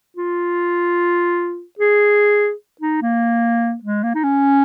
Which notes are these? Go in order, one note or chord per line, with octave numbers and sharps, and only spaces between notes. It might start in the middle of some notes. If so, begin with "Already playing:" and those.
F4
G#4
D#4
A#3
G#3
A#3
D#4
C#4